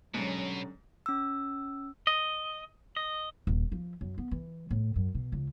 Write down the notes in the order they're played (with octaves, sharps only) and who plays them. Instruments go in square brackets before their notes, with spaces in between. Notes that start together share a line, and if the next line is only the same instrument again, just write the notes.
[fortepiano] G#2 [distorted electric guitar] B2 [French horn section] D3 G3 C#4 [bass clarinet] F#3
[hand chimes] C#4 E6
[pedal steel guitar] D#5
D#5
[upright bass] D#1
F3
F#2
B3
E3
A2
F#2
B2
C#2